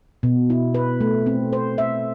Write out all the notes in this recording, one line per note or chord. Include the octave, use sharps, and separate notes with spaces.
B2
E4
B4
A3
C4
C5
E5